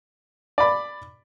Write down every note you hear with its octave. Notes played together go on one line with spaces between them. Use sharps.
D5 B5